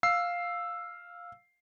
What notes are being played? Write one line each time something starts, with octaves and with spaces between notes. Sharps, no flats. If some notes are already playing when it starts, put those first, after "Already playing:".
F5 E6 C7